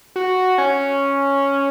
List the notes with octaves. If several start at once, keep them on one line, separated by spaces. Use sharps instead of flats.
F#4
C#4